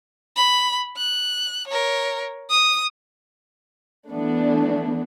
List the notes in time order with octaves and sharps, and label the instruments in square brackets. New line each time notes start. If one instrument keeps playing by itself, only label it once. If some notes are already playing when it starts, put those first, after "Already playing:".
[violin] B5
F#6
A#4 C#5
D#6
[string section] E3 A3 B3 D4